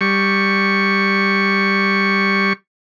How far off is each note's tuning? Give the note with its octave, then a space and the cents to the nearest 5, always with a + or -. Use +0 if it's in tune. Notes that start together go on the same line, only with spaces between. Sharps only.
G3 +0 C#6 +0